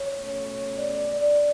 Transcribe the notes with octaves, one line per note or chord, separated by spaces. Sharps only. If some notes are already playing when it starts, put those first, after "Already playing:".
Already playing: C#5
B2 A3 C#4
D5
D5